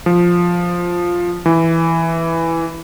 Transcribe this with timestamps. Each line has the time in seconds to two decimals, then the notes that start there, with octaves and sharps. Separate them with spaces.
0.06 F3
1.46 E3